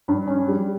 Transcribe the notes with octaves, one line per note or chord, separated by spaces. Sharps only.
G2
C#4
G3